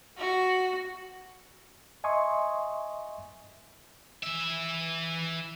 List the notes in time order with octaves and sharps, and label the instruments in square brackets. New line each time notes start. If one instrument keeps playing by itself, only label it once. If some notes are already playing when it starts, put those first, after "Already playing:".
[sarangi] F#4
[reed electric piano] D#5 E5 G#5 C6 C#6 D#6
[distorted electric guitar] E3 E5